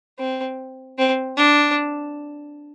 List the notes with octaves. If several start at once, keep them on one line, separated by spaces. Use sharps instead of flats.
C4
C4
D4